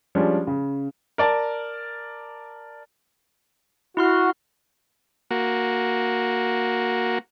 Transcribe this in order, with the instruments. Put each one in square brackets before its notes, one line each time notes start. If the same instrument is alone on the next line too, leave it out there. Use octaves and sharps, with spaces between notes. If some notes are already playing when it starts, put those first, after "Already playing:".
[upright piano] F3 G3 G#3 C#4 D4
C#3
[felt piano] A#4 D5 A5
[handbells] E4 C6 F6 [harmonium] F#4
[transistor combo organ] A#3 F#4